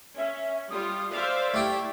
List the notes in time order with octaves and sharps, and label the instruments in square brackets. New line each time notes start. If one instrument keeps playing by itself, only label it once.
[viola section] C#4 [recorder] E5
[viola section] G3 F4 [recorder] D#6
[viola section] C5 E5 F5 [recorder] D5
[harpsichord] A3 G4 G5 [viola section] E4